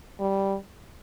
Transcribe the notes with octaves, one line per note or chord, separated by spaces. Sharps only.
G3